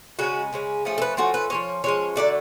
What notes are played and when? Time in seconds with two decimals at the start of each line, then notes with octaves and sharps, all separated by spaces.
0.19 C#3 G#3 C#4 F#4
0.53 C#3 G#3 C#4
0.85 F3 A3 C#4 G#4
0.98 A4
1.02 B4
1.17 F3 A3 C#4 F#4
1.34 B4
1.50 F3 G#3 C#4 C#5
1.84 F3 G#3 C#4 C#5
2.16 D3 F#3 A3 D5